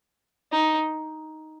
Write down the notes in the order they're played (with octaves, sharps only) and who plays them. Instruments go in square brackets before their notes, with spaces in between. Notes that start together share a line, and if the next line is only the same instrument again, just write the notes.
[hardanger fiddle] D#4